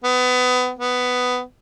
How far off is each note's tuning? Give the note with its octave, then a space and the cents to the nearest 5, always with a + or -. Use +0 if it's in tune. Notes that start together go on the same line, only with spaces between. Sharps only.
B3 +25
B3 +10